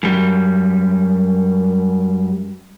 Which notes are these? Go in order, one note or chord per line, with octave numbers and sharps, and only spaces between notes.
F#2 G3